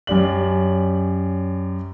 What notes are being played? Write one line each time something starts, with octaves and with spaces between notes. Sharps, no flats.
F#2 C#4 G4 D5 F#7